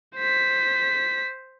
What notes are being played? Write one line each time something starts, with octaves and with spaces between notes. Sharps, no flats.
C5 B6